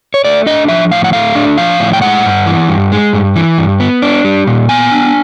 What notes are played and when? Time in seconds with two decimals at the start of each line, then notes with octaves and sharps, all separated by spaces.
0.14 C#5
0.25 A3 D5
0.46 D4 D#5
0.68 F3 E5
0.91 A2 F5
1.04 F#5
1.13 A3 F5
1.35 D4
1.58 F3 F5
1.80 A2
1.93 G5
2.02 G#3 F#5
2.25 G2
2.46 E3
2.69 G2
2.92 G#3
3.13 G2
3.36 E3
3.58 G2
3.80 B3
4.02 D4
4.25 G3
4.47 A#2
4.69 B3 G#5
4.91 D4